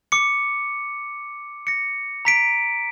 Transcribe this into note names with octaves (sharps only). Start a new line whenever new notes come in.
D6 C#7
A#6 C#7
A#5 B6 D7